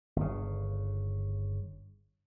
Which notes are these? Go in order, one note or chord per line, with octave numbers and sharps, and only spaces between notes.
G1 C#3